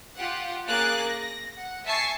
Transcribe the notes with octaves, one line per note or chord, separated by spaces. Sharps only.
F4 G4 F#5
A#3 C#4 G#4 D6 F#6 A6
A#6
F#5
E5 G#5 A5 C#6 C7